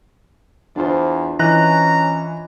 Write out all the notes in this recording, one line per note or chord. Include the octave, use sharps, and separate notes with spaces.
E2 D4 F4 C5
E3 C#4 D#5 A#5 F#6